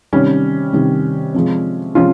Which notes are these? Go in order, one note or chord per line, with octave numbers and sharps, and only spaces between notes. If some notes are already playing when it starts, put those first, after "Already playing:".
C3 D#3 G3 C#4
C3 D#3 G3
C3 F3 G#3
C3 F3 G#3 C#4 F4